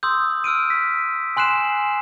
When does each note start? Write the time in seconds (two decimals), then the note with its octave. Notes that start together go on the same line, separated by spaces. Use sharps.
0.03 C6 D#6 E6 G6
0.44 E6 F6 D7 D#7
0.70 B6
1.37 G#5 C6 F#6 C7 E7